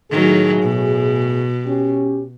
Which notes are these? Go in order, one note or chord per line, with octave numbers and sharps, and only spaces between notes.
A2 D#3 F#3 G#4
B2
C#4 G4